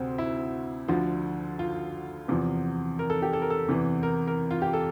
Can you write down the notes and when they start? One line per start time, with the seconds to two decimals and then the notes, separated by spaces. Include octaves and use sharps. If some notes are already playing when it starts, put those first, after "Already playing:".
Already playing: D2 C3 C4
0.18 E4
0.88 D2 D3 F3
1.59 F4
2.28 E2 C3 F3
2.99 A#4
3.10 A4
3.22 G4
3.33 A4
3.42 A#4
3.50 A4
3.69 E2 C3 E3
4.03 A#4
4.27 A#4
4.51 F4
4.62 G4
4.73 A4